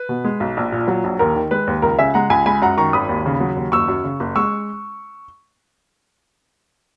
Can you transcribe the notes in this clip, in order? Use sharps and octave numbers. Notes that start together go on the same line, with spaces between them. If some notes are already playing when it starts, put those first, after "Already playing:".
Already playing: B4
B2
G#3
B1
A#1
A#2
F#3
A#1
D#2 A#4
D#3
G#3 B4
D#2
C#2 A#4
C#3 E5 G#5
G#3 F#5 A#5
C#2 G#5 B5
G#3 G#5 B5
F#2 F#5 A#5
D#3 A#5 C#6
G#1 B5 D#6
D#2
C#3
F#3
D#2
F#1 C#6 E6
F#2
C#3
F#1
G#3 C#6 E6